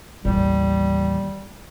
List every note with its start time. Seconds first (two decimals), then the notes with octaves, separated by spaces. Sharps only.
0.25 A1 D#2 G3